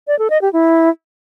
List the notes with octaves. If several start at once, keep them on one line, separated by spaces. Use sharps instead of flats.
D5
A4
D#5
G4
E4